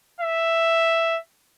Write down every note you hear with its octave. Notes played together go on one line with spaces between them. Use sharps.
E5